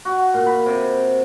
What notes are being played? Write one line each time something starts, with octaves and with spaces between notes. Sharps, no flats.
F#4
A#2
B5
C3